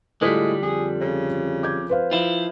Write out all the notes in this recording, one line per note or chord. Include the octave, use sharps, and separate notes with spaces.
A2 D3 G3 G#3 F4 A4 B6
F2 G#4
C#3
D6 G6 G#6
B4 C5 F5
F3 E4 F4